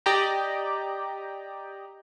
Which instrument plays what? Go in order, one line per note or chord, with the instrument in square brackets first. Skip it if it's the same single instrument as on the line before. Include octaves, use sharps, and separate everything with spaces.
[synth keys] G4 D5 D#5 G5 A#5